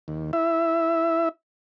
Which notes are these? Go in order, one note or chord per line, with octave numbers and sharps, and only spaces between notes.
D#2
E4 E5